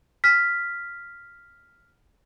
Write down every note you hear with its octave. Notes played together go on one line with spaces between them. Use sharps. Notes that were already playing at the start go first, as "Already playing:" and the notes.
F6 B6